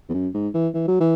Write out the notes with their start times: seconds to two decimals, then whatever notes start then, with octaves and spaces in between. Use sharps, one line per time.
0.09 E2
0.14 F#2
0.34 G#2
0.54 E3
0.74 E3
0.88 F#3
1.00 E3